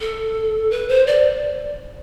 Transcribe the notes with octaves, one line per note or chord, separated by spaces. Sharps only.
A4
B4
C5
D5